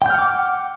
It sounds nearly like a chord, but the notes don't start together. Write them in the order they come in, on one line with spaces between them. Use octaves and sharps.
G5 G6 F6 F#5 D6